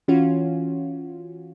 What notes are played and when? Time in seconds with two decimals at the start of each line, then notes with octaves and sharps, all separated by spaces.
0.08 E3 C#4 F4 F#4